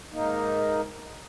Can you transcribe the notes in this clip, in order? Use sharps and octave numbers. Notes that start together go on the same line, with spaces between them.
G#2 A#3 D#4